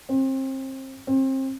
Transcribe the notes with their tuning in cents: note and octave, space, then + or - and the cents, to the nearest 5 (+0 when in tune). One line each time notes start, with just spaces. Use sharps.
C4 +30
C4 +30